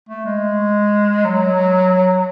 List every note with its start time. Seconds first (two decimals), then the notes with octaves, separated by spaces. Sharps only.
0.09 A3
0.25 G#3
1.25 F#3